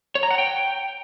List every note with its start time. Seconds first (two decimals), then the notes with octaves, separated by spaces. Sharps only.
0.15 C#5
0.23 A#5
0.31 F#5
0.38 G5